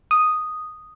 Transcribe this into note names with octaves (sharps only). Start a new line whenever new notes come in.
D#6